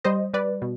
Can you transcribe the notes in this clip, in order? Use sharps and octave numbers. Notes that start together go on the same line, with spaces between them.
G3 C5 D#5
G3 B4 D5
B2